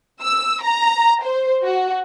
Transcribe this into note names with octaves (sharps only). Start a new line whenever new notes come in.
E6
A#5
C5
F#4